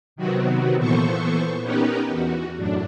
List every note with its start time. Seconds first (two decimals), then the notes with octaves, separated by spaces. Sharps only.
0.16 C3 D#3 F#3 B3 C4 F#4
0.77 A#2 E3 B3 A4 C5 C#6
1.62 B3 C#4 D#4 G4 A#4 B4
2.08 E2 F#4
2.57 F#2 A2 D4